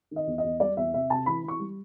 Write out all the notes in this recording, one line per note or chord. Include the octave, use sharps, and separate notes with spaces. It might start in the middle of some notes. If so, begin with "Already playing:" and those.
D#3 D#5
E2
D#5
E2
G3 D5
E2 E5
C3 E5
C3 A5
E3 B5
E3 C#6
G3